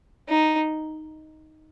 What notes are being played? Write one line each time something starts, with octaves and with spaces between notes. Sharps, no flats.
D#4